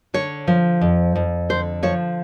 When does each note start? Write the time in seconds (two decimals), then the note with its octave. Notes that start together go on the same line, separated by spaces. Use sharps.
0.14 D3 C#5
0.47 F3
0.81 F2
1.16 F2
1.49 D3 C5
1.83 F3 C#5